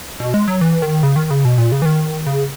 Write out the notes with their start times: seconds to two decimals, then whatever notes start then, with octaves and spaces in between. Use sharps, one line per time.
0.20 B2
0.34 G#3
0.48 F#3
0.61 E3
0.82 D#3
1.03 C#3
1.16 D#3
1.31 C#3
1.45 B2
1.58 A#2
1.72 C#3
1.82 E3
1.86 D#3
2.27 C#3